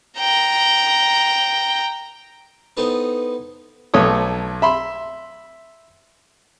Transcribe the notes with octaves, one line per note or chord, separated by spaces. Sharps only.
G5 A#5
B3 C4 D#4 E4 A4 B4
B1 A3 C#5 D#6
E5 B5 C6